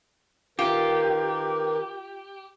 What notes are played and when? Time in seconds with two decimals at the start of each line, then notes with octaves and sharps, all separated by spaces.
0.59 D#3 F4 G4 A#4 B4